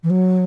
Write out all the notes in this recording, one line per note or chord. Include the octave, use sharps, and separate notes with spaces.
E3
F#3